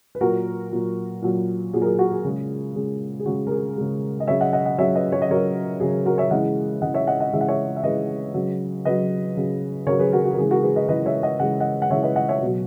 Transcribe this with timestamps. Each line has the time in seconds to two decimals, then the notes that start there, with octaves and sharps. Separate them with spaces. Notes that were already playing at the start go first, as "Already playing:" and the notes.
0.15 B4
0.21 A#2 F#3 F#4 A#4
0.71 A#2 F#3
1.22 A#2 F#3
1.73 A#2 F#3 G#4
1.82 A#4
1.86 G#4
1.99 F#4
2.12 G#4
2.24 C#3 G#3
2.75 C#3 G#3
3.20 G#4
3.26 C#3 G#3 F#4
3.47 A#4
3.51 G#4
3.77 C#3 G#3
4.20 D#5
4.27 C#3 F#3 C#5 E5
4.41 D#5 F#5
4.53 D#5 F#5
4.65 D#5 F#5
4.78 C#3 F#3 C#5 E5
4.95 B4 D#5
5.12 C#5
5.22 D#5
5.29 C#3 F#3 A#4 C#5
5.80 C#3 F#3 G#4
6.06 F#4 A#4
6.18 C#5 E5
6.31 C#3 E3 G#3 D#5 F#5
6.82 C#3 E3 G#3 D#5 F#5
6.94 C#5 E5
7.07 D#5 F#5
7.20 D#5 F#5
7.33 C#3 E3 G#3 E5
7.41 F#5
7.48 C#5 E5
7.77 E5
7.83 C#3 E3 G#3 B4 D#5
8.34 C#3 F#3
8.85 C#3 F#3 B4 D#5
9.36 C#3 F#3
9.86 C#3 F#3 A#4 C#5
9.99 G#4 B4
10.12 F#4 A#4
10.25 F#4
10.33 A#4
10.37 C#3 E3 G#3 G#4
10.51 F#4 A#4
10.63 G#4 B4
10.76 B4 D#5
10.88 C#3 E3 G#3 B4 D#5
11.06 C#5 E5
11.23 D#5 F#5
11.39 C#3 E3 G#3 F#5
11.60 D#5 F#5
11.82 F#5
11.90 C#3 E3 G#3 C#5 E5
12.03 B4 D#5
12.16 D#5 F#5
12.29 C#5 E5
12.42 B2 F#3